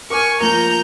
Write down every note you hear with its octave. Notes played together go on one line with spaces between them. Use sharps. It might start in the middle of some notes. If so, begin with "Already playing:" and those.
A#4 G#5 C#6 D6 F6
F3 A#3 A#4 A#5 G6